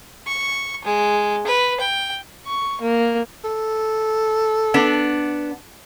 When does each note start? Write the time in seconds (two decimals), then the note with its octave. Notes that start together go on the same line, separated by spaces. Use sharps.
0.27 C#6
0.85 G#3
1.47 B4
1.80 G5
2.46 C#6
2.81 A#3
3.44 A4
4.74 B3 D4